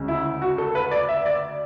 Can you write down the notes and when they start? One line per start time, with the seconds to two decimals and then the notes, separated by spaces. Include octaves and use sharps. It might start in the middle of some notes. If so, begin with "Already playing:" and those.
Already playing: D2 C#3 G#3
0.08 E4
0.42 F#4
0.58 A4
0.75 B4
0.91 D5
1.09 E5
1.26 D5